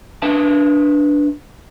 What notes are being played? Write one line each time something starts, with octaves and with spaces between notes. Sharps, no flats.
D4 B4 E5 A5